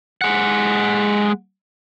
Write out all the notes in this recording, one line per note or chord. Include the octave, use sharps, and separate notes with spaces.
G#3 F#5